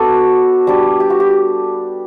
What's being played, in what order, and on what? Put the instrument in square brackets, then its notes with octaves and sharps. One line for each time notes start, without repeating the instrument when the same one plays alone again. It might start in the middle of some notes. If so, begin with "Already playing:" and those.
Already playing: [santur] B3 D4 F#4 A4
G3 D4
G4
F#4
G4